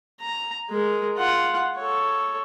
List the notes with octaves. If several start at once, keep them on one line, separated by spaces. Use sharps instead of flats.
A#5
G#3 A#4
F4 F#5
A4 C#5